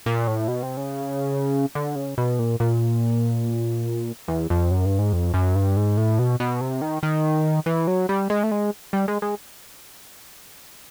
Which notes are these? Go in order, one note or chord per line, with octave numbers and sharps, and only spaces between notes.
A#2
A2
B2
C3
C#3
D3
C#3
B2
A#2
A#2
E2
F2
F#2
G2
G#2
F2
F#2
G2
G#2
A2
B2
B2
C3
D#3
D#3
E3
F#3
G3
G#3
A3
G#3
G3
G#3
G#3